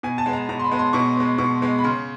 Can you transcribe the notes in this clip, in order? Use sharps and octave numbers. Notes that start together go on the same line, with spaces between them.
B2 G#5
A5
G#3 B3
A#5
B2 A#5
C6
B5
G#3 B3
C6
B2 C#6
G#3 B3
B2 C#6
G#3 B3
B5
C#3 C6